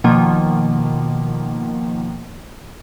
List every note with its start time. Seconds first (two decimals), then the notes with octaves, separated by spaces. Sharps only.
0.04 B2 D#3 F3 A#3